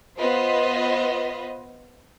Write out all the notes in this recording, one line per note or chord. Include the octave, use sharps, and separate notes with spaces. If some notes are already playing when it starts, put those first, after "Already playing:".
B3 F4 B4 C5 D#5